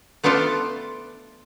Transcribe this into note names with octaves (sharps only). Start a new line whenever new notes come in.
A3 B3 D4 F4 A4